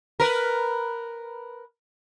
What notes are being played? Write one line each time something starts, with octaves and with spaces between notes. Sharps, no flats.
A#4 B4